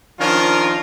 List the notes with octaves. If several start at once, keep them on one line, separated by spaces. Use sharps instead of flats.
D#3 F3 C#4 D4 F4 A#4